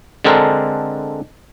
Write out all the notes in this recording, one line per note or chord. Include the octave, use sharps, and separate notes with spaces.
D3 G#3 C4 D4 A4 A#4